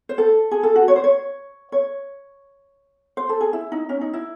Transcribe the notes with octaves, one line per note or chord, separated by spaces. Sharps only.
C5
A4
G#4
A4
F#4
C#5
C5
C#5
C#5
C5
A4
G#4
E4
D#4
C#4
D#4
E4